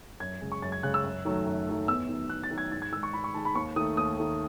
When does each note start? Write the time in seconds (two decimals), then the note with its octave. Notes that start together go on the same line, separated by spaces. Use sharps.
0.20 F#2 G#6
0.41 C#3 G#3
0.52 C#6
0.62 F#2 A6
0.72 G#6
0.83 C#3 G#3 F#6
0.94 E6
1.04 F#2
1.25 D#3 F#3 A3
1.46 F#2
1.67 D#3 F#3 A3
1.88 E2 E6
2.09 D#3 F#3
2.30 E2 F#6
2.43 A6
2.51 D#3 F#3
2.58 G#6
2.72 G#2 A6
2.82 G#6
2.92 D#3 E6
2.96 G#3
3.03 C#6
3.13 G#2 B5
3.24 C#6
3.34 D#3 G#3 A5
3.45 B5
3.55 D#2 C#6
3.76 D#3 A3 D#6
3.97 D#2 D#6
4.18 D#3 A3